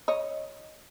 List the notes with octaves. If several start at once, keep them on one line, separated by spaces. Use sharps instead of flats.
C#5 D#5